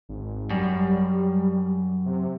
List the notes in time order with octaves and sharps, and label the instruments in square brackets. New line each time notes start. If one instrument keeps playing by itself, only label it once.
[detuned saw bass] G#1
[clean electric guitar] F#2 [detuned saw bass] G3
[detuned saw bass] C3